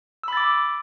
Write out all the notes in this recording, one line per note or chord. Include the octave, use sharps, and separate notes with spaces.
B5 D6 E6 A6